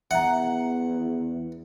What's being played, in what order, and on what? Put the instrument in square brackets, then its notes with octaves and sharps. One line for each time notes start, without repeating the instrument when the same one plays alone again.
[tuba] E2 [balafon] E5 A#5 [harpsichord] F#5